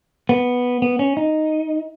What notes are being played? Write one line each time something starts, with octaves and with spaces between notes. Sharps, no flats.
B3
B3
C#4
D#4